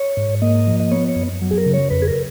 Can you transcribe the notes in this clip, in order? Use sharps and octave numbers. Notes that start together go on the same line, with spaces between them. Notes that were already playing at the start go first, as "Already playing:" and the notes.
Already playing: C#5
G#2
A#3 D#5
F3
D#5
B3 C#5
C#5
F#2
F#3
G#4
A#4
C#3
C#5
F2 B4
G#4
A#4